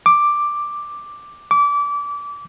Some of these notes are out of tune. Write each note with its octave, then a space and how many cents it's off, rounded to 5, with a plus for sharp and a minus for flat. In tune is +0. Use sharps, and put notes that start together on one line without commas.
D6 +5
D6 -25